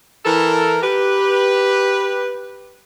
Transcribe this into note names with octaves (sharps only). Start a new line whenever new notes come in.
E3 A4 A#4
G4 B4